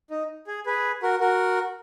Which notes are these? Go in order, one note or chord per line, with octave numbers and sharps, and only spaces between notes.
D#4
G#4
G#4 B4
F#4 A#4
F#4 A#4